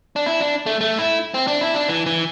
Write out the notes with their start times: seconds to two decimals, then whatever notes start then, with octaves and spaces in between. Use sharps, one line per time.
0.16 D4
0.26 E4
0.40 D4
0.66 A3
0.81 A3
0.99 E4
1.34 C4
1.48 D4
1.61 E4
1.74 D4
1.88 E3
2.06 E3